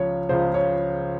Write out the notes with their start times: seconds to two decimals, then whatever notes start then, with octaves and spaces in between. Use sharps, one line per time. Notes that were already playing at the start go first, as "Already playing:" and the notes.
Already playing: C#2 C#3 F3 C#5
0.29 C#2 C#3 F3 C5
0.54 C#5